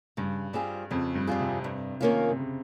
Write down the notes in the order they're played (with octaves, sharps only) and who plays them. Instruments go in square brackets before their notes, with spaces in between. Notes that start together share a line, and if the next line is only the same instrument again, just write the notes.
[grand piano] G2 [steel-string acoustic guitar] C#3
[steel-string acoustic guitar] G3 C4 F4 G#4
[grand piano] F2 [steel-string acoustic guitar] C#3
[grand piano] G2
[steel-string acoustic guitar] G3 C4 F4 G#4
[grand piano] C3
[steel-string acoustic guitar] G2
D#3 A#3 C#4 F4
[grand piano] C3
C#3